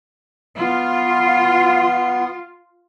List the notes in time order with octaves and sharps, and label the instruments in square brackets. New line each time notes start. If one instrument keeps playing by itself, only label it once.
[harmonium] B3 [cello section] F4